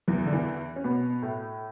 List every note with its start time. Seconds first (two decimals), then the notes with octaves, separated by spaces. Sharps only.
0.08 E2 E3
0.26 D3
0.33 E2 E3
0.76 C#4
0.84 B2 B3
1.22 A2 A3